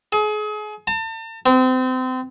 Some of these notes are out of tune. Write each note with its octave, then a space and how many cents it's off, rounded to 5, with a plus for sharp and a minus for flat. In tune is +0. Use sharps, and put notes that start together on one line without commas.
G#4 +35
A5 +40
C4 -30